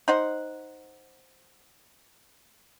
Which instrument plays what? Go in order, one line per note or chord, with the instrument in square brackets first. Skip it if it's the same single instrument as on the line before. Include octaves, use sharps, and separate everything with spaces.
[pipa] D#4 C5 F#5